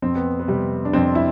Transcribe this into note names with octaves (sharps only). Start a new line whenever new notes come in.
F2 C4
B3
B3
C3 G3
D4
F2 C4
E4